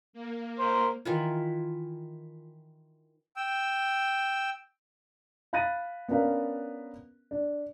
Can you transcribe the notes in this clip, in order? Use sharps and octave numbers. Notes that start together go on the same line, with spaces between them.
A#3
A#4 C5
D#3 E3 F4
G5 E6
F5 B5 F#6 A6 A#6 D#7
B3 C#4 D4 A#4 B4 F5
D4